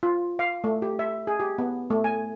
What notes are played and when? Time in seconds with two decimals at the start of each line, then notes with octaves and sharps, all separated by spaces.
0.03 F4
0.39 F5
0.64 A3
0.82 G4
0.99 E5
1.27 G#4
1.40 G4
1.58 B3
1.90 A3
2.04 G#5